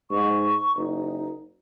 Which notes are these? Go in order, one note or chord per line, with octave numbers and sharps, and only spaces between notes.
G#2 C#6
F#1 D#4